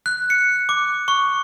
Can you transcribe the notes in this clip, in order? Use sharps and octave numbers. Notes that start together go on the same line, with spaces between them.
F#6
C#7
D6
C#6